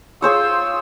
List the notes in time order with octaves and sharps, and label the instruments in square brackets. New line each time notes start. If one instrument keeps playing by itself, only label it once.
[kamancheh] F4 E6 [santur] G#4 C5 C#5